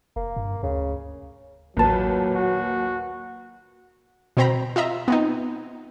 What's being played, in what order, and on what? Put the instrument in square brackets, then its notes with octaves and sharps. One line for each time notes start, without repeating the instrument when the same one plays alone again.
[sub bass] F1 [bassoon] A#3
[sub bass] G2
[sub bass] D2 [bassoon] C#3
[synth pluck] A1 A5 [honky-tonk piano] D#2 A#2 B4 [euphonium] F#3
[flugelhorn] F#4
[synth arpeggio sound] B2 C4 C5 G5 A#5 B5
F4 D#5 E5 A#5
B3 C4 D#4